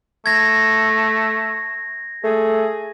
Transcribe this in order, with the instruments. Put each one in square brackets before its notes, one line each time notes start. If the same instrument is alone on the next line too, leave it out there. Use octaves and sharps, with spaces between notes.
[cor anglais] A3 [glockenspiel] G#6 A#6
[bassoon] A3 [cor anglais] G#4